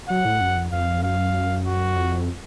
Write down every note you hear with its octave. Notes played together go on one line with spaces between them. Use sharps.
F#3 F#5
A2
F#2
F2
F2 F5
F#2 F5
F#4
F2